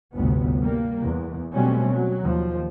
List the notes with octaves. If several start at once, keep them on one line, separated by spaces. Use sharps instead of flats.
G1 D2 A2 C3 B3
G3 A#3
E2
B2 F#3 G3 A3 C4 C#4
F#3
D#2 F3